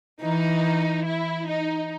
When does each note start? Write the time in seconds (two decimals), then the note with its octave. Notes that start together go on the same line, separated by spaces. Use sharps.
0.22 E3 D#4
1.05 E4
1.47 D#4